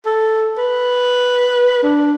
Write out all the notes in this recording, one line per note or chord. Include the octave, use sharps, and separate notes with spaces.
A4
B4
D4